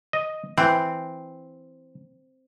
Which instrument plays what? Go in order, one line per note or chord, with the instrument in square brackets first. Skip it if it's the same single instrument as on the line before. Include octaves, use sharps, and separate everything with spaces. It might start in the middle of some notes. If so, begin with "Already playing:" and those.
[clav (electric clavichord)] D#5
[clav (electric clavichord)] E3 [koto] C4